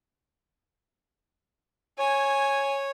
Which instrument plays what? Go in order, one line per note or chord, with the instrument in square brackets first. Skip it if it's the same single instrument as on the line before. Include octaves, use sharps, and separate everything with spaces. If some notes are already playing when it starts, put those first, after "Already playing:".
[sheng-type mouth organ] C#5 [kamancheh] G#5